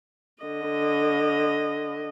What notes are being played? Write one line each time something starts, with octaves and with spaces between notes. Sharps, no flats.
D3 D#5